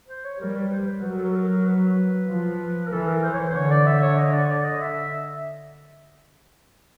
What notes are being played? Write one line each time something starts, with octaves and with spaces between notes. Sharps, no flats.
C5
C#5
G3 A#4
B4
C5
B4
F#3 B4
A#4
A4
A#4
A4
A#4
B4
F3
A#4
E3 A4
A#4
C5
C#5
C5
C5
D3 C#5
D5
E5
C#5
D#5
D5
C#5
D5
D#5
E5